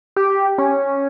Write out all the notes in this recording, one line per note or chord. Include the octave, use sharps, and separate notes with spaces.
G4
C#4